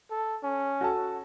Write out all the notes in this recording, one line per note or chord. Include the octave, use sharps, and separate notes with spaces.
A4
C#4
F#4 A4 A5